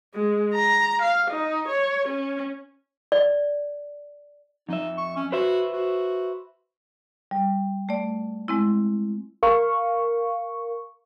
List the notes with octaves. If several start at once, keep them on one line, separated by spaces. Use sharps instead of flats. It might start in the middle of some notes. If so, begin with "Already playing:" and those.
G#3
A#5
F5
D#4
C#5
C#4
D5
F2 D#4 E5
C#6
C#4
F#4 B4 C5 E5
F#4
G3
A3 D5
G#3 C4 E4
A#4 F5 C#6